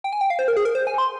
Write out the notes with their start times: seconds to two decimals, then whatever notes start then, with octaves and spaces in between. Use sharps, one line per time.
0.04 G5
0.13 G#5
0.21 G5
0.30 F5
0.39 C5
0.48 A#4
0.57 G#4
0.65 A#4
0.75 C5
0.87 G#5
0.98 C6